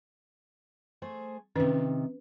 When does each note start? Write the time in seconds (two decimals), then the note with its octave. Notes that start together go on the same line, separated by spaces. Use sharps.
1.02 A3 G#4 C5
1.56 C3 D#3 C#4 B4